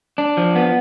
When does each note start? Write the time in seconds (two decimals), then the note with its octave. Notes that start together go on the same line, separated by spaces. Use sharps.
0.18 D4
0.37 F3
0.56 B3